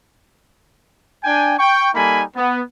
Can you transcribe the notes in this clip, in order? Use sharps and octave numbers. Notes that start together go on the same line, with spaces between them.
D4 G5 G#5
G5 C#6
G3 A#3 D#4 A4 G#5 B5
B3